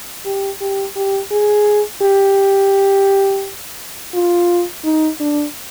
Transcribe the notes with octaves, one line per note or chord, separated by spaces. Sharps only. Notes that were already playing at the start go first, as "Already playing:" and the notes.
G4
G4
G4
G#4
G4
F4
D#4
D4